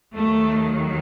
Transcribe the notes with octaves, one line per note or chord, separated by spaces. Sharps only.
D#2 D#3 F#3 A3